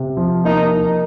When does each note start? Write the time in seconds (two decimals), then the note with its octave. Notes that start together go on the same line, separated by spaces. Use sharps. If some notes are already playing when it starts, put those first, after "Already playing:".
Already playing: C3
0.17 F3
0.44 A#3 D#4
0.72 D#4